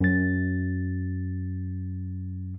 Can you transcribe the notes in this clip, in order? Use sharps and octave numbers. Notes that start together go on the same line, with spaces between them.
F#2 A6